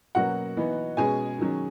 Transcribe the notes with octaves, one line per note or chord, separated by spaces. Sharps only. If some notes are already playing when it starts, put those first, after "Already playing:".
B2 F#3 A#3 C#4 F#4 F#5
E3 B3 D#4
B2 G#3 C#4 G#4 G#5
D#3 F#3 C#4